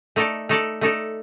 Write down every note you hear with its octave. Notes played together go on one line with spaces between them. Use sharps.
A3 D#4 A4 D5
A3 D#4 A4 D5
A3 D#4 A4 D5